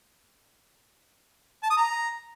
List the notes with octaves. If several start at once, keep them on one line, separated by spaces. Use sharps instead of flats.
A5
D#6
A#5